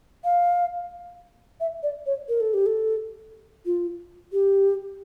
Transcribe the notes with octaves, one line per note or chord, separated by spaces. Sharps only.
F5
E5
D5
C#5
A#4
A4
G4
A4
F4
G4